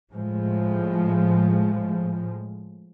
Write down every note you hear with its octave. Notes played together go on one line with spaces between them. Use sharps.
A2 F3 G#3